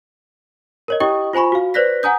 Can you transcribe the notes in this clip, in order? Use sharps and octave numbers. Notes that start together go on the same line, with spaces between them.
A#4 C#5 D#5
E4 G4 D#5 G5 C#6 D#6
F4 C5 G#5 B5 C#6
F#4 F5
B4 C5 D5 F#6 A#6 B6
F#5 G#5 A#5 D#6 G6